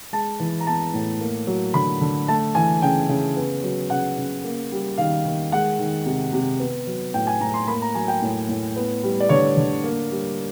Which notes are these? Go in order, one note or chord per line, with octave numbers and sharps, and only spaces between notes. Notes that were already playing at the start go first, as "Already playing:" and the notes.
G#3 A5
E3
A#5
B3 A5
A2
A#3
F#3
D3 B5
D3
A3 A5
E3 G#5
C#3 G5
C#3
B3
F#3
C#3 F#5
C#3
A#3
G3
D#3 F5
D#3
G#3 F#5
D#3
C3
C3
B3
F#3
A2 G5
G#5
A2 A#5
C6
A#3 B5
A#5
F#3 G#5
G5
A2
A2
B3
G3
D5
D3 C#5
D3
A#3
G3